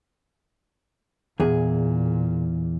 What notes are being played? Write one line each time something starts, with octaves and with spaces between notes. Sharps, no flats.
E2 A#2 G#4